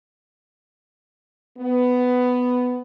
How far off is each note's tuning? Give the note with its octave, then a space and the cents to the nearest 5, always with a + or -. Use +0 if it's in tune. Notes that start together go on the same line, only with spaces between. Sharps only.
B3 +10